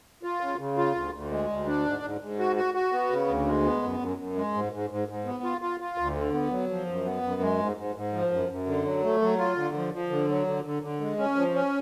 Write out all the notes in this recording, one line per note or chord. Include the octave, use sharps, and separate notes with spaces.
F4
C#3
C#3
F4
D2
D2
G#3
D2
D4
G#2
G#2
G#2
F#4
F#4
F#4
B3
C#3
D2
G#3
B3
F#2
F#2
F#2
G#3
G#2
G#2
G#2
G#2
B3
F4
F4
F4
D2
D3
B3
F#3
F3
F#2
B3
F#2
G#3
G#2
G#2
G#2
F3
F#2
F#2
D3
F#3
A3
F#3
F4
D3
F3
F3
D3
F#3
D3
D3
D3
G#3
C#4
F3
C#4